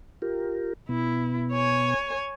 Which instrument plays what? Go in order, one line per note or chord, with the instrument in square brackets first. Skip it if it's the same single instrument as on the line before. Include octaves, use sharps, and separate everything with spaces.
[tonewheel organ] F4 G4 A#4
[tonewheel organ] B2 B3 [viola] E4
[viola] C#5 G#5